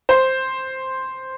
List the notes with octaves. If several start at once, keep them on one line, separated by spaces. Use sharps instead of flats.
C5